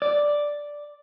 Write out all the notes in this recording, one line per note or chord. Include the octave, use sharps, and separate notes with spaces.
D5